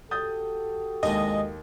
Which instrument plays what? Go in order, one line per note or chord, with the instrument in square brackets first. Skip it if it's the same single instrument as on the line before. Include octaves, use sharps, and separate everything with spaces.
[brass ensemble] F#4 G4 A4 [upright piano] D#6 G6 A6
[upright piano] D#2 [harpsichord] C3 G#3 D4 [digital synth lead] D#5